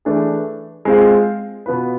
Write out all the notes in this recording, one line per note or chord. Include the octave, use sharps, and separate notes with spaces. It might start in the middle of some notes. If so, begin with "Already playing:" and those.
E3 A3 D4 G#4
G#3 C4 F4
B2 B3 F4 B4